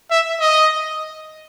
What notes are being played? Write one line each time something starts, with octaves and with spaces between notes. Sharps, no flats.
E5
D#5